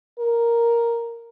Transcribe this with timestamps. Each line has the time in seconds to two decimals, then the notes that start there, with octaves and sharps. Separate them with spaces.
0.19 A#4